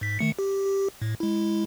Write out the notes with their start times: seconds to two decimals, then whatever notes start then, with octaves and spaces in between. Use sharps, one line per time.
0.01 G#2 B6
0.19 D#3 A3 C#7
0.39 G4
0.66 G4
1.02 A2
1.20 G#3 E4